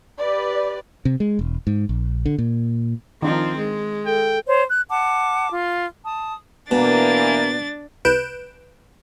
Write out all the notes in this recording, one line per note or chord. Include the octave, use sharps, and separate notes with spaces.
G4 B4 D5
C3
G#3
E1
G#2
A#1
D3
A#2
D#3 F3 C4 D4 D#4
G#3
A4 G5
C5 C#5
F#6
F#5 A5 D6
F4
A5 D#6
B2 E3 A#3 D4 A6
C2 B4 F#6 G6 D7 E7